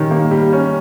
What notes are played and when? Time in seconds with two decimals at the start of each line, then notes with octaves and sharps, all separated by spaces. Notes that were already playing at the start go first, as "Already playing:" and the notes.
Already playing: D#3 G3 C#4
0.11 A#3
0.31 G3
0.53 C#4